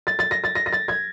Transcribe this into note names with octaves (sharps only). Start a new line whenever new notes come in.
A6
A6
A#6
A6
A#6
A#6
A6
G#6